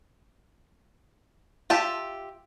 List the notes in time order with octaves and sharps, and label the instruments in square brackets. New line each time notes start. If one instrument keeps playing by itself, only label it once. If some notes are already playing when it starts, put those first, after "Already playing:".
[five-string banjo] F4 G4 E5 A5